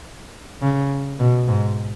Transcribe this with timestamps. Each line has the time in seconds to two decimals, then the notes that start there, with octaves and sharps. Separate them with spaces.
0.62 C#3
1.19 B2
1.48 G#2